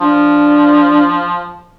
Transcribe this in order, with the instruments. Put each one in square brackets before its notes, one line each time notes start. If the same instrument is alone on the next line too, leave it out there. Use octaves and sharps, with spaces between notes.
[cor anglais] F3 [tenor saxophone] D4